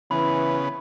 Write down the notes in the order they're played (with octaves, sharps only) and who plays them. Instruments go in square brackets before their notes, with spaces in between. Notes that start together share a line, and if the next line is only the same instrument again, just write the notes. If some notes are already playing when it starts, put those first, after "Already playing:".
[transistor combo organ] C#3 B3 [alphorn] E3 [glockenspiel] B5